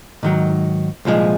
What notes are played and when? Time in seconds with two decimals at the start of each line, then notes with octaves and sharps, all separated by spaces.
0.23 G#2 D#3 F#3
1.05 C2 A#2 F3 G#3